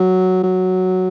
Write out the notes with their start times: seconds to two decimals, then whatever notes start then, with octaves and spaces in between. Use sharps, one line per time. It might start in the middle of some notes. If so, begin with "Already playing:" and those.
Already playing: F#3
0.43 F#3